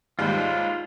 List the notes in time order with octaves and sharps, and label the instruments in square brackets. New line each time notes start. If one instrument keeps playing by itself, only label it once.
[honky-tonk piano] D#2 G#2 G3 [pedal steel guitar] F4 C5